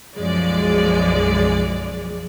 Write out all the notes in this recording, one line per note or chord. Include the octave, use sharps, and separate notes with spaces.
B1 F#2 F3 G#3 D5